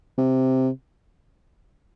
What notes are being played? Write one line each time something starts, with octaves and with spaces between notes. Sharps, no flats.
C3